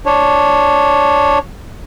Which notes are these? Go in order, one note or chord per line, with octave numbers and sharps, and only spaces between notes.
D4 C#5